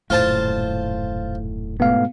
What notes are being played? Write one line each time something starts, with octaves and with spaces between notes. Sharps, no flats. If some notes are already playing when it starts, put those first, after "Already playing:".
D#1 F#2 A2 F4 C5 A5
G#2 B2 A3 B3 F5